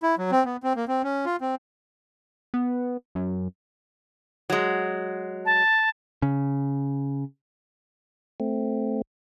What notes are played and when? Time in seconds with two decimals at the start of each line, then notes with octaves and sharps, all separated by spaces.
0.03 E4
0.19 F#3
0.32 C4
0.45 B3
0.63 C4
0.76 A#3
0.88 C4
1.04 C#4
1.26 F4
1.41 C4
2.54 B3
3.15 F#2
4.50 F#3 G#3
5.45 A5
6.22 C#3
8.40 A3 C4